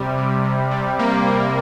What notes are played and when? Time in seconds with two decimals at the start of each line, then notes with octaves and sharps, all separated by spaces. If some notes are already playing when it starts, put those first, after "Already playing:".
Already playing: C3 G3
0.17 C3
0.45 C3
0.71 G3
0.99 A#3
1.27 G3